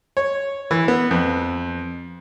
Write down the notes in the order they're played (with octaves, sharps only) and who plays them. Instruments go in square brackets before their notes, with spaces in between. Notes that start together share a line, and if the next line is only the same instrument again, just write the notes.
[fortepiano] C#5
E3
B3
F2